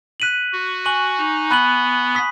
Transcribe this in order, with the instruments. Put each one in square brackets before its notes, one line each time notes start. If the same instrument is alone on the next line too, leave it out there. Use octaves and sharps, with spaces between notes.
[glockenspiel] F#6 B6 D#7 F#7
[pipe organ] F#4
[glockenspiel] G#5 C#6 F#6 D#7 F#7
[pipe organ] D#4
[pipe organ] B3 [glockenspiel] B5 F#6 D#7 F#7
[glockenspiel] D#6 B6